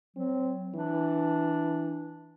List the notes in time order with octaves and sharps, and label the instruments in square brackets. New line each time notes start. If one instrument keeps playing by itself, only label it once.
[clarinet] F#3 [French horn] C4
[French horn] E3 [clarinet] D4